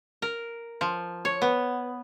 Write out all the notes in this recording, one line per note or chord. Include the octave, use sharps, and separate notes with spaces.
A#4
F3
C#5
B3